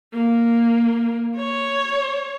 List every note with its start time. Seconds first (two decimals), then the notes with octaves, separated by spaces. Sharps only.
0.14 A#3
1.36 C#5